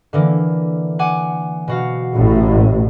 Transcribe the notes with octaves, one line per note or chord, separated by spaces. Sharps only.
D3 E3 A#3
F#5 G#5 D6
B2 F#4 F5
A1 A2